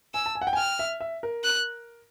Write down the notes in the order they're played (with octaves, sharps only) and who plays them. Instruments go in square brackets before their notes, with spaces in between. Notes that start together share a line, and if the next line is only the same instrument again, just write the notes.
[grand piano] G#5 [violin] E6
[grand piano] A5
G#5
F#5
G5
G#5
[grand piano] G5 [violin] F6
[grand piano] E5
E5
A#4
[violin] F#6